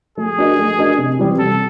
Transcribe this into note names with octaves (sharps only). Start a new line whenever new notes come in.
A3 G#4
D4 F#4 A#4 D#5
A3
D4 F#4 A#4 D#5
C3
E3 G3 C4
C3 A4